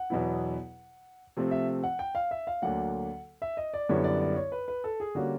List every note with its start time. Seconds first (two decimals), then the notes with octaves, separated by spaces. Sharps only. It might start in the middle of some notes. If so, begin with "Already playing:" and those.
Already playing: F#5
0.10 E2 B2 F#3 B3 E4
1.37 C3 F3 A3 C4
1.51 E5
1.83 F#5
1.99 G5
2.15 F5
2.31 E5
2.47 F5
2.62 D2 D3 F#3 A#3 F#5
3.42 E5
3.57 D#5
3.74 D5
3.89 F#2 D3 G3 B3 E4 C#5
4.04 D5
4.21 D5
4.36 C#5
4.52 B4
4.68 B4
4.84 A4
5.00 G#4
5.15 D3 G3 A#3 C#4 F#4